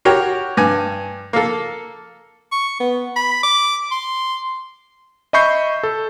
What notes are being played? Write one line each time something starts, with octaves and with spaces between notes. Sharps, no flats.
F#4 G4 A#4 C#5 G5
G2 G#5
A#3 A4
C#6
B3
B5
D6
C6
D#5 E5 B5 C#6 G6 C7
A4